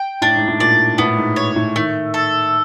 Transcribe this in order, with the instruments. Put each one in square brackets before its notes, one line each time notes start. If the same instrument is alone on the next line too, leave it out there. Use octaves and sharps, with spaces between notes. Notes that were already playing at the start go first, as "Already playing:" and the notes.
Already playing: [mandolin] G5
[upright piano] A2 [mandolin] D4
[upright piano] G#2
A2
[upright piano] A#2 [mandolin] D5
[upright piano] A2 [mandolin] B3
[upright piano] G#2
[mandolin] C#5
[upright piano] A2
[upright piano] D#3 [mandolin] A3
[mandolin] A4